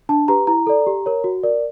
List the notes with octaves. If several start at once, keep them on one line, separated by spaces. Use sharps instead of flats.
D4 A5
G4 B4 A#5
E4 A#5
A4 D5
G4
A#4 C#5
F#4
A#4 D5